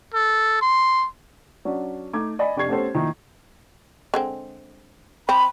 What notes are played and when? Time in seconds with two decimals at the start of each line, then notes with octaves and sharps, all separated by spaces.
0.15 A4
0.62 C6
1.65 F#3 C#4 D4
2.13 A3 D#4 D6 G#6
2.39 D5 D#5 G#5 B5
2.57 F1 G4 D5 C#6 G#6 C7
2.68 A3 B3 C#4 G4 A4 C5
2.94 A#2 D#3 F3 D#4 E4
4.14 D3 G#3 C4
5.29 C4 B5